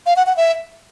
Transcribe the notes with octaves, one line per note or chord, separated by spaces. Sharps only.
F5
F#5
F#5
E5